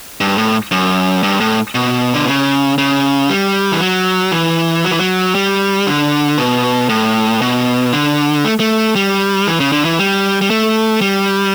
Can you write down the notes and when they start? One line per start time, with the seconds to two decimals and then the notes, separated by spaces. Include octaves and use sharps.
0.21 G2
0.38 A2
0.71 F#2
1.23 G2
1.40 A2
1.75 B2
2.14 D3
2.27 C#3
2.78 C#3
3.30 G3
3.72 E3
3.80 F#3
4.32 E3
4.84 F#3
4.91 E3
4.99 F#3
5.35 G3
5.86 D3
6.38 B2
6.89 A2
7.41 B2
7.92 D3
8.45 A3
8.60 A3
8.95 G3
9.47 E3
9.60 C#3
9.72 D3
9.85 E3
9.99 G3
10.41 G3
10.50 A3
11.01 G3